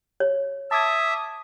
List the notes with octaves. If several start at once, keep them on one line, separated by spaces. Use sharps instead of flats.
C#5
E5 A5 D6 D#6 G#6